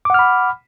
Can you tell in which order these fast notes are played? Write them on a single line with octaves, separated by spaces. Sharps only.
D6 F#5 F6 B5